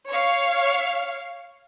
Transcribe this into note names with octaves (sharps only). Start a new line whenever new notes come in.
C#5 F5